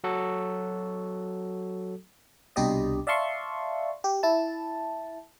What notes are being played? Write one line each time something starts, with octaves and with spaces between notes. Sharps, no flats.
F#3 F#4 A4
C2 B2 D4 G4 D5 D#5
D5 E5 F5 A5 C6 C#6
G4
E4 A5